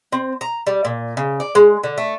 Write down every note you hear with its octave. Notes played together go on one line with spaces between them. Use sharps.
C4
A#5
G3
A#2
C#3
D5
G#3
D3
A3